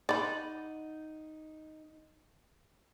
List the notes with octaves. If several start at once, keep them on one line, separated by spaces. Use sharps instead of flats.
D#4 D5 F#5 B5